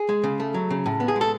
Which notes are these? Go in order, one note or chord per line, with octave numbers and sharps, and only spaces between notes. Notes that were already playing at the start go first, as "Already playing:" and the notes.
Already playing: G#4
G#3
C#3
A3
F#3
C#3
A2
B3
G#4
G#3
A4